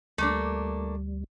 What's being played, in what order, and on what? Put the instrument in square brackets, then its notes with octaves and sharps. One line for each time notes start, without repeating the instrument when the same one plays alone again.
[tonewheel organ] D2 G3 [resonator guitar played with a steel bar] A3 A#3 D4